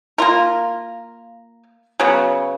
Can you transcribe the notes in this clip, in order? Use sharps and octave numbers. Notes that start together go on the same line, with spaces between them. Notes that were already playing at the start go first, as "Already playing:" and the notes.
A#3 F4 A#4
C#3 F#3 B3